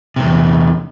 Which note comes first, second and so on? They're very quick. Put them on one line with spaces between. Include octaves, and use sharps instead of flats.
C3 G2 E2